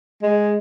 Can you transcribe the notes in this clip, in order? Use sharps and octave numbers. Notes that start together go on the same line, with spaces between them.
G#3